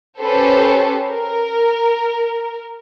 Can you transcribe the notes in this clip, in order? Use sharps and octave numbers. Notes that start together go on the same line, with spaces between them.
C#4 G4 A4 B4 C5
A#4